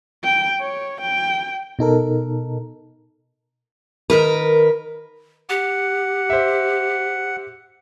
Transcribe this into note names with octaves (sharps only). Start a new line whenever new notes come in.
G5
C#5
G5
B2 D#4 A4 A#4
D#3 A#4 B4
G4 F#5
C5 E5